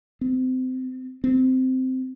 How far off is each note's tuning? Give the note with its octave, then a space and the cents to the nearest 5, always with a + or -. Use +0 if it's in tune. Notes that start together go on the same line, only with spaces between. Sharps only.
C4 -30
C4 -15